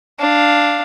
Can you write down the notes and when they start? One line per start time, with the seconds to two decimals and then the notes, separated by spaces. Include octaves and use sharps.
0.19 D4 F5